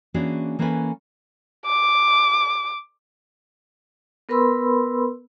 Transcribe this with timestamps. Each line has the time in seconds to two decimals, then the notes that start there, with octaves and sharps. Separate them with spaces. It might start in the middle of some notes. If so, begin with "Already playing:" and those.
0.14 E3 A#3 C#4 D4 F#4 G#4
0.59 E3 A#3 C#4 A4 B4 G#5
1.66 D6
4.29 B3 A#4 B4 B5 C6 E6